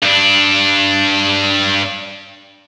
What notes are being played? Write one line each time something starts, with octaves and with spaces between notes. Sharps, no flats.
G2 D4